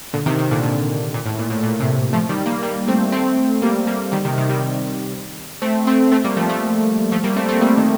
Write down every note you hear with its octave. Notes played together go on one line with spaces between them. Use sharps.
A#2 D3
C3 D#3
C3 D#3
A#2 D3
A#2
A#2
A2
A#2
A2
A#2
A2 C3
F3 A3
D#3 G3
G3 A#3
G3 A#3
A3 C4
A3 C4
G3 A#3
G3 A#3
D#3 G3
C3 D#3
C3 D#3
D#3 G3
A3 C4
A3 C4
A3 C4
G3 A#3
F3 A3
F3 A3
F3 A3
G3 A#3
A3 C4
A3 C4
G3 A#3
D#3